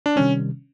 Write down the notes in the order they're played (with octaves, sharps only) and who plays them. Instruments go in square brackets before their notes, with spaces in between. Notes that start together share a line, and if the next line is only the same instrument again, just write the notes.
[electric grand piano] D4
[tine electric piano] C3 D#3 G3 [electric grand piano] C#4